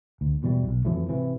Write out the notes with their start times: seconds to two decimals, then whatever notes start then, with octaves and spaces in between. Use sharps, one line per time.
0.21 D2
0.43 E2 B2 E3 G3
0.64 B1
0.85 F2 E3 F#3 A3
1.09 G#1 C3 E3